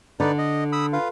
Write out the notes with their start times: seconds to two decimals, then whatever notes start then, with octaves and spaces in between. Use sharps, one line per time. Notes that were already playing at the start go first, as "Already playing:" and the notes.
0.20 D3 D#4 B4 D5
0.38 D#5
0.72 B5 D#6 E6
0.93 F4 B4 F5